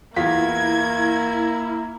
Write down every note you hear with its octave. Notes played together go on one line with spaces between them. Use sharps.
E2 A#3 E4 F4 G#6 B6